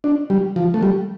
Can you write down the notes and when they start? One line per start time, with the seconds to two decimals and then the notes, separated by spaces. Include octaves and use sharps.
0.04 D4
0.30 G3
0.56 F3
0.74 A3
0.83 G3